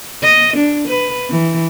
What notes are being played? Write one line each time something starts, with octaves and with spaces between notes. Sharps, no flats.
D#5
D4
B4
E3